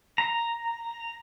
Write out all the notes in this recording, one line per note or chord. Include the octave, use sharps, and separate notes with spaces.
A#5